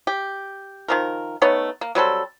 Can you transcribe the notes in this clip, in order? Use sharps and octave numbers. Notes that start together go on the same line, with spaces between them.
G4
D#3 F3 A#4
A3 B3 D#4 C#5
A#3
F#3 G3 C4 A4